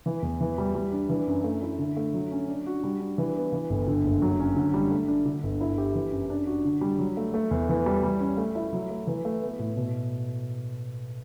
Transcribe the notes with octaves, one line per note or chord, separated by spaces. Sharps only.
E3
E2
E3
G3
G3
D4
E3
F#2
A3
E4
D3
A3
F#3
C#4
D4
F#4
G3
D4
E3
B3
E3
G1
D3
F#1
F#3
C#4
D3
G3
A3
D4
D3
G1
E4
G4
E3
F#2
D4
F#4
D3
G3
F#3
A3
A3
E2
E3
G3
G3
C#4
A3
E4
F#3
A3
E3
A3
B3
A2
B2